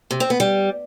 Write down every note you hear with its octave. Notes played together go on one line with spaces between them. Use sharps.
C3
C4
B3
G3